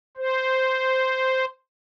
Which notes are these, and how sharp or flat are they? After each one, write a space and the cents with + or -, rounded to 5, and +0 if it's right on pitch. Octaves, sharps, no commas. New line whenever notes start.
C5 -5